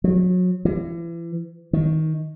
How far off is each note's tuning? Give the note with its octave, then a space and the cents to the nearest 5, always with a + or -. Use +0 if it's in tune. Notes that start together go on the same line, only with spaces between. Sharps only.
F#3 -30
E3 +35
D#3 +20